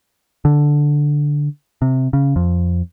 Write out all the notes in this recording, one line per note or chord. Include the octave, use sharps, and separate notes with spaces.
D3
C3
C#3
F2